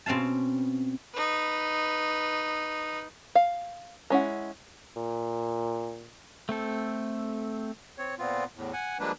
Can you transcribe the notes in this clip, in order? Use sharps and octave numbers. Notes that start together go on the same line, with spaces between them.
B2 C4 C#4 F5 A5
D#4 B4
F5
G#3 C#4 E4 F#5
A#2
A3 C4 A4
C4 C#5
A#2 B3 C4 F4
E2 A2
F#5 G#5
F3 G3 G#3 A#3 D4 B4